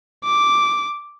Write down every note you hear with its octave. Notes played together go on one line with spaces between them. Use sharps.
D6